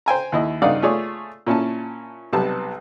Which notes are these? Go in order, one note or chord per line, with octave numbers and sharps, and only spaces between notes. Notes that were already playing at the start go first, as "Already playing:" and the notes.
C5 G5 G#5 A#5
D#2 E4 D#5
G2 C#3 D#4 D5 F5 F#5
A3 F4 G#4 C#5 D5
A#2 C#4 E4 A5
B1 C3 G3 B3 A5